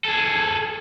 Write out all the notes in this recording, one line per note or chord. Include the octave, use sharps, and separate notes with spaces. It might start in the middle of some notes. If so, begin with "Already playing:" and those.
G#4 A4